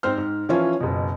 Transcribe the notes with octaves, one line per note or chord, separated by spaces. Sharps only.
G#2 C4 C5 F6
G#2
E3 F3 C#4 F4
F#1 B2